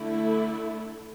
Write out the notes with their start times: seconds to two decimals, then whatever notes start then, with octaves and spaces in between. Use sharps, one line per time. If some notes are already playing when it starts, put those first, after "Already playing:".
Already playing: D3 A3 E4